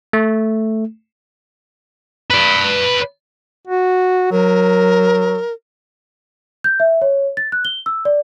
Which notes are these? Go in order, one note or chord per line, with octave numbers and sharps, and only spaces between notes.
A3
B4 D5
F#4
F#3 A#4
G6
E5
C#5
A6
F#6
G7
E6
D5